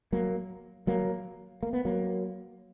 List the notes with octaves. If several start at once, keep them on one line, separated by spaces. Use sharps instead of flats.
F#3 A#3
F#3 A#3
A#3
B3
F#3 A#3